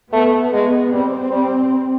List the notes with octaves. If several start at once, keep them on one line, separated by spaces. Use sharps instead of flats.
A3 B3
G#3
G3 C4
G3